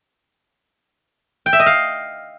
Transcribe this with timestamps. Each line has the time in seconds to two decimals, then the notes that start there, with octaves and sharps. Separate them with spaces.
1.46 G5
1.53 E5
1.60 D#5
1.66 F5